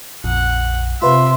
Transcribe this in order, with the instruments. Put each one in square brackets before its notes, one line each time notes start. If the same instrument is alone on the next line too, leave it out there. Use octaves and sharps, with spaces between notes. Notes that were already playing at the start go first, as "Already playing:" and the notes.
[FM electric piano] A#1 F2 [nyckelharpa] F#5
[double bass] C3 [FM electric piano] F4 B4 [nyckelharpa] E5 [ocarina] C6